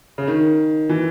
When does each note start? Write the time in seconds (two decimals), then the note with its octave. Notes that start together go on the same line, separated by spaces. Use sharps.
0.18 C#3
0.27 D#3
0.89 E3